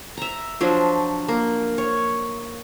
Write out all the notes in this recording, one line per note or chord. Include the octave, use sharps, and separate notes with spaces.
E5 A#5
F3 F#3 D4
A#3
C#5